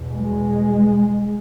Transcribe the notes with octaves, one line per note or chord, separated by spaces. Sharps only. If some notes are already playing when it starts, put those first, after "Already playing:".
Already playing: E2 B2
G#3